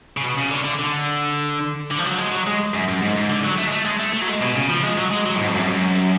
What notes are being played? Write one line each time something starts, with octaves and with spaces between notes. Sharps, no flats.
C#3
B2
C#3
D3
D3
D3
D3
F3
F#3
G#3
F#3
G#3
F#2
F#2
G#2
G#2
D3
F#3
A3
G#3
A3
G#3
A3
A3
F#3
G#3
B2
C#3
F3
G#3
F#3
G#3
F#3
A2
G#2
F2
F#2
G#2
F#2